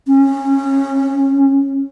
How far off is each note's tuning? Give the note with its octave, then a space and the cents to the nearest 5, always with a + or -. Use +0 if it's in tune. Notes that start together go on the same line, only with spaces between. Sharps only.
C#4 -20